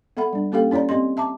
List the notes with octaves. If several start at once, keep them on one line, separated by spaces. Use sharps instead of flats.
B3 A4 E5 F#5 B5
G3 D4
A#3 C#4 G4 A4 F5 G5
C#4 E4 C#5 D5 A#5
C4 G4 D#5 C6
E5 A5 A#5 D6